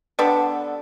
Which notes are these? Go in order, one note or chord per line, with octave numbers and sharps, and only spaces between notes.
D3 G3 B3 A4